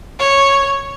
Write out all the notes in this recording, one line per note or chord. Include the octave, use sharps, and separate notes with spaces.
C#5